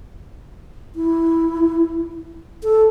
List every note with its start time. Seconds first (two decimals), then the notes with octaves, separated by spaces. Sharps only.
0.95 E4
2.63 A4